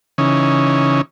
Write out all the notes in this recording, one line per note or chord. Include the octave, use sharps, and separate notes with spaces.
C#3 E3 C#4 D#4